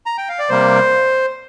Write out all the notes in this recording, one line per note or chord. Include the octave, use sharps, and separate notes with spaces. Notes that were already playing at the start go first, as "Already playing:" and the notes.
A#5
G5
F5
D5
C3 G3 A#3 C5